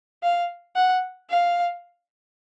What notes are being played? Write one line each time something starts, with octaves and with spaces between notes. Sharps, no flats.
F5
F#5
F5